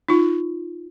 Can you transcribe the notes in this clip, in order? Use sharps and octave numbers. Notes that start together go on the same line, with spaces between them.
D#4 F4